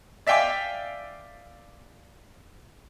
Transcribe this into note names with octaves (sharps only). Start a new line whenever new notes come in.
D5 E5 F5 G5 G#5 D6